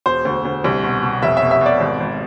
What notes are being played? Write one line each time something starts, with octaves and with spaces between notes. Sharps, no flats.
E1 C5
D2
D2
C2
B2
B2
F1 E5
E5
B2
E5
B2 D5
G#1
G#1